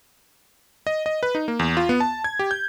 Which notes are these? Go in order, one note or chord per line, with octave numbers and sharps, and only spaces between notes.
D#5
D#5
B4
D#4
A#3
E2
F4
B3
A5
G#6
G4
G6